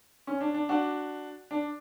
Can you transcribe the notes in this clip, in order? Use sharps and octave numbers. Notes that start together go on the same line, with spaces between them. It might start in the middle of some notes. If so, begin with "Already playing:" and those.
C#4
D4
D4
D4 F#4
D4